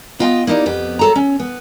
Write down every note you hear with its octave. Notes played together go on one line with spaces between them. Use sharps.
B3 F4 D#5 G5
A#3 D#4 E4 G4 D5
F2 B3 G4
F#3 A4 A#5
C#4
B3